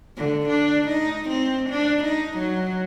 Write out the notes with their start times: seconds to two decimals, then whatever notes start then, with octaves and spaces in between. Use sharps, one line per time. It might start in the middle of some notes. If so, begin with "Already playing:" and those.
0.17 D3
0.49 D4
0.88 D#4
1.29 C4
1.70 D4
2.04 D#4
2.38 F#3